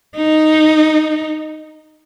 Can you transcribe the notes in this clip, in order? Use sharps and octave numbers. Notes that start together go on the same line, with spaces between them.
D#4